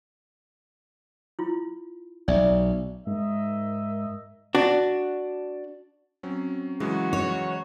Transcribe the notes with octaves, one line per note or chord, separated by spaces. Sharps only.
E4 F4
B1 D5 E5
G#2 A#4 D#5 E5
D4 F#4
F#3 C4 C#4
C#3 E3 F#3 G#3 F#4
C#5